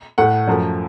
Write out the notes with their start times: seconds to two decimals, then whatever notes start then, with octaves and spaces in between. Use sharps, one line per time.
0.18 A2 A3 F#5
0.47 F#2 F3 A3